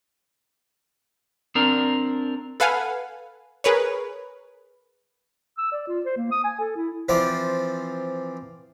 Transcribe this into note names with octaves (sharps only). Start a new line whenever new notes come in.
C4 D4 A#4
A4 B4 F5 F#5 G#5
G#4 A#4 B4 C#5
E6
D5
F4
C5
A#3
D#6
G#5
A4
E4
E3 F3 C4 D5